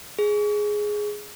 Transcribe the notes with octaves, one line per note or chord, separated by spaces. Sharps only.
G#4